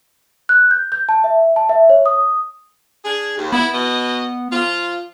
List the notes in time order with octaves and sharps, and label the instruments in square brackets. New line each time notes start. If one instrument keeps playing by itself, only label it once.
[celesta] F#6
G6
G6
A5
E5
A5
E5
C#5
D#6
[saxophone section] D4 G#4
D#2
[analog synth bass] B3 [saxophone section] E4
[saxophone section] B2 D#5
F3 F4